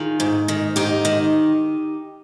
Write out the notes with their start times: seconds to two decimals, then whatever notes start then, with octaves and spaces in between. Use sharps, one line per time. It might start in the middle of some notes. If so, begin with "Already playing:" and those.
Already playing: D#3 F4 G#4
0.20 G#2
0.48 D#3
0.76 G#2 D#4 G4
1.05 D#3